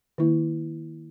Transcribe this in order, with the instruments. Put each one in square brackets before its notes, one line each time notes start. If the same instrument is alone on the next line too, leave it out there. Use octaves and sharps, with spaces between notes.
[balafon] D#3 A#3 E4